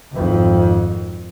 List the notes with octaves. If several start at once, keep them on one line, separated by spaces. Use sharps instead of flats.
G#1 F2